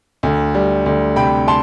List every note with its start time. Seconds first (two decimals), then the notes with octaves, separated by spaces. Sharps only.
0.23 D2
0.55 G3
0.86 D2
1.16 C3 G5 B5
1.48 A5 C6